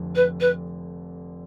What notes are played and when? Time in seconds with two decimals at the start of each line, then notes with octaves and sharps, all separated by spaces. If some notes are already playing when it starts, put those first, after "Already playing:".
Already playing: F1 F2 D3
0.15 B4
0.40 B4